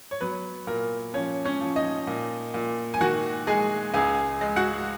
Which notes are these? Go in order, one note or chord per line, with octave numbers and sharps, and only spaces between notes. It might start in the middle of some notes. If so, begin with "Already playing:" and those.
C#5
F#3 B3 B4
A#2 A#4
F3 C#4 C#5
C#4 C#5
F3
D#4 D#5
A#2
A#2
G#5
D#3 F#4 F#5
G#3 G#4 G#5
C#2 G#4 G#5
G#3
F#4 F#5